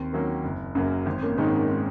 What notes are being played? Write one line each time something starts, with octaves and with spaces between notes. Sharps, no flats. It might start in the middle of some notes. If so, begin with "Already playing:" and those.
Already playing: D#2 C4
D#3 F#3 A#3 C#4
F#1
F#2 C#3 F#3 A#3
G#1 C4
A#3 C#4
G#2 D#3 G#3 C4 C#4 D#4
A#3 C#4
C4